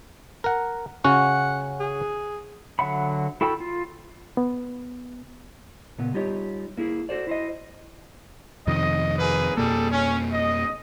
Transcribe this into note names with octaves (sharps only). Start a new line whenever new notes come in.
A#4 F#5
C#3 C#4 F#4 F#5
G#4
D3 F#3 E5 F#5 B5
E4 F#4 A4 G5 B5
F4
B3
A#2 C#3 B3
G3 D#4 F4 G4 C#5 D#5
A#3 E4 F4 G#4
F#4 A4 C5 D5
E4 C5 D#5
F2 C3 D#3 D#5
A#3 G#4 B4
F2 B2 G3 A#3 G#4 A4
C#4
D#5